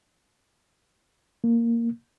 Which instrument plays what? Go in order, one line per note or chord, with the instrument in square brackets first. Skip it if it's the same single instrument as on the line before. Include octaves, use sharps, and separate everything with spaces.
[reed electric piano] A#3